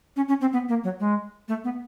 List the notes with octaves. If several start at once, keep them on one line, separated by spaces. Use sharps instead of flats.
C#4
C#4
C4
B3
A#3
F#3
G#3
A3
B3